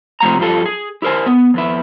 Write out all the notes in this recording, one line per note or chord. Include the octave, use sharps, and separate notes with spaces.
C3 F3 A3 F#5 A#5
G2 F3 G3 F4 A4
G#4
E4 G4 A#4 C5 G#5
B3
F2 B3 E4